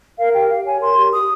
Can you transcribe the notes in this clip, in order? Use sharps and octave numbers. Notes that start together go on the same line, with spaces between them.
A#4 F5
G4 G5
G4 F5
C#5 G#5
A#4 C6
G4
G4 D#6